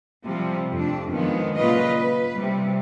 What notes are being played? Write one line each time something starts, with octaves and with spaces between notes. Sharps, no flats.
C3 F3 G3
F2 A3 D4
D#3 F3 G#3 B3
A#2 C#3 F#3 F4 B4 D#5
B4
C3 G3